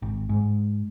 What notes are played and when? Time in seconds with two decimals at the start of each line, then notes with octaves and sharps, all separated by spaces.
0.02 G#1
0.29 G#2